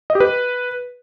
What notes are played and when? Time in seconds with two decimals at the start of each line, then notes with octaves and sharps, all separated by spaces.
0.10 D#5
0.15 G4
0.20 B4